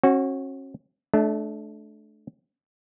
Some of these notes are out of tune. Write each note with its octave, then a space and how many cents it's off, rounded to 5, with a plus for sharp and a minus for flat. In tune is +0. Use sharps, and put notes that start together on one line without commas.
C#4 -40 F#4 +0
A3 -25 D4 +5